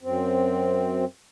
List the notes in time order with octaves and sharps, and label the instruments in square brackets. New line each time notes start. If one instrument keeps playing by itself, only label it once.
[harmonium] F#2 C4